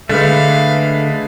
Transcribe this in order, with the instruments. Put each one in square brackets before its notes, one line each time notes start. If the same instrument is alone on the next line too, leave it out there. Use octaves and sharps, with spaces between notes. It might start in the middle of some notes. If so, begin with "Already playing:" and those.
[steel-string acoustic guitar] D3 [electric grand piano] G#3 B4 [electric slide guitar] A3 [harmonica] F5